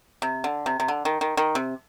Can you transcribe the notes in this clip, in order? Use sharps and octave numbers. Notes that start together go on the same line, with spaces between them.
C3
D3
C3
C3
D3
D#3
D#3
D#3
C3